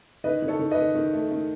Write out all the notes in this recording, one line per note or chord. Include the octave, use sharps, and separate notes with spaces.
D#3 B4 D#5
D#3
A4 C#5
D#3
B4 D#5
D#3
D#3
A3
D#3